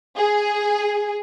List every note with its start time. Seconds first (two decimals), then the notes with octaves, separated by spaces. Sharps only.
0.17 G#4